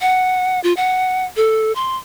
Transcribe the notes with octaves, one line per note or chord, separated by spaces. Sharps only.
F#5
F4
F#5
A4
C6